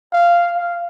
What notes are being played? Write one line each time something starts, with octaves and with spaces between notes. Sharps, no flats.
F5
F5